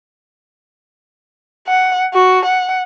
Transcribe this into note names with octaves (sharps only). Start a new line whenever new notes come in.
F#5
F#4
F#5